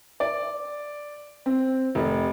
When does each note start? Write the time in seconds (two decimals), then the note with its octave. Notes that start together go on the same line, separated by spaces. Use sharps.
0.20 D5
1.46 C4
1.95 F1